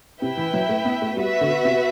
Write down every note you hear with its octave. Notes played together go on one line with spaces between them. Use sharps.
C3 E4 B4 E5 G5
E3
F#3
A3
B3
A3
G3 B3 F#4 B4 E5
D3
C3